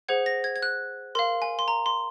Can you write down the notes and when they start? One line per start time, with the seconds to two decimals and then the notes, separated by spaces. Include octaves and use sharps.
0.09 G#4 C5 F#5 G#6
0.26 A#6
0.44 G#6
0.56 G#6
0.62 F#6
1.15 A#4 F5 C6
1.42 G#5
1.59 C6
1.68 A#5
1.86 C6